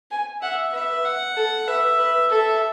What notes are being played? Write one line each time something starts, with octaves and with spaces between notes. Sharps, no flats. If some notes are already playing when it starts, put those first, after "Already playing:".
G#5
E5 F#5
B4 E5
F#5
A4
B4 E5
B4
A4 E5